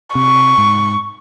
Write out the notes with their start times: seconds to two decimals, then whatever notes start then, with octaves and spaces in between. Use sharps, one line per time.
0.15 C3 C#6
0.58 G#2